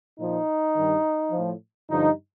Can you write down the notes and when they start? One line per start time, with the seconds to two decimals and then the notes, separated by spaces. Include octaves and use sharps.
0.18 A#2 F3 D#4
0.76 G2 D#3 G3
1.32 F3
1.37 A2
1.89 G2 D3 F3 D#4